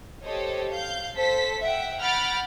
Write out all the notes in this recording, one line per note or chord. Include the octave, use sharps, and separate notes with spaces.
G4 A4 C5 C#5 D#5
F5 G6
A4 C5 B6
E5 F#5 G5
F#5 B5 F6 G6 A6 D7